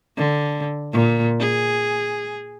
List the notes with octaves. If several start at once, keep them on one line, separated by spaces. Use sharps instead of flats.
D3
A#2
G#4